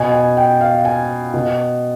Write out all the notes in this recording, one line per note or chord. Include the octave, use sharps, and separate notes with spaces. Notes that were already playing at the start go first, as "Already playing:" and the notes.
Already playing: B2 G#5
G#5
G5
F5
G#5
B2